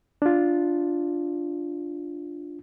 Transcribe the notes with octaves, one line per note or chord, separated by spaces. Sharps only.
D4 F4